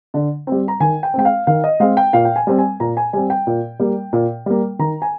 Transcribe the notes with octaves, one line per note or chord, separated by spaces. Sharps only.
D3
G3 C4
A#5
D#3 G#5
G5
G#3 C4 G5
F5
D#3 F5
D#5
G#3 C4 F5
G5
A#2 F5
G5
G#5
G3 C4
G#5
A#2 A#5
G#5
G3 C4 G#5
G5
A#2
G3 A#3
A#2
G3 A#3
D#3 A#5
G#5